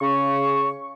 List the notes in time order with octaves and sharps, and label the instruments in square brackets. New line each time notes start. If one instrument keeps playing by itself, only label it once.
[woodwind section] C#3 C#6